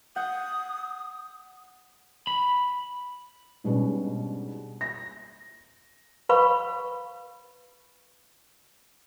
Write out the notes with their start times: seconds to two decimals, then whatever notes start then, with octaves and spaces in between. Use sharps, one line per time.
0.16 F#5 D#6 G6
2.27 B5
3.64 G#2 B2 G3 B3 C#4 D4
4.81 A#6
6.29 B4 F5 B5 C#6